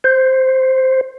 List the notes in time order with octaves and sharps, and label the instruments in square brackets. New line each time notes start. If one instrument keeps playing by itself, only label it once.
[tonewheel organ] C5